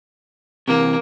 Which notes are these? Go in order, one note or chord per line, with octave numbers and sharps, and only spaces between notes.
C3 E3 A#3